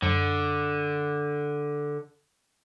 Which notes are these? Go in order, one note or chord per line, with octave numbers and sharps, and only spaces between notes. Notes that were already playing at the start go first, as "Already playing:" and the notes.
F#2 D3